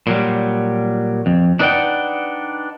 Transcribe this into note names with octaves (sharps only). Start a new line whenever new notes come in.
A#2 F#3 G3
F2
D4 D#4 B4 D5 F#5 G5